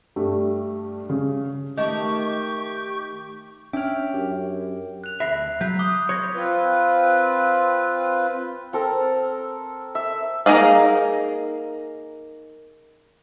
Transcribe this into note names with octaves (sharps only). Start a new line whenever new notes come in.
G2 G3 A3
C#3
D#3 A3 G4 D#5 C#6
C#4 D4 C#5 E5 G5 F6
F#2 G4
F#6 F7
D2 E5 B5 A#6 C7
F#3 G6 B6
D6 D#6 G7
C#5 C6 G#6 A#6
C4 F4 B4
C4 A4 A#4
E5
A#3 D#4 G#4 F5